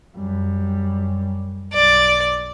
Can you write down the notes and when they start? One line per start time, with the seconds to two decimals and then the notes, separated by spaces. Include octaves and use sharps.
0.17 F#2 G3
1.73 B1 D5